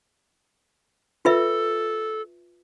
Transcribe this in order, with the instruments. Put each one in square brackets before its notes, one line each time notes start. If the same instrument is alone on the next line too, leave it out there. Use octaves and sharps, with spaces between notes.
[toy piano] F4 B4 E5 [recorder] A4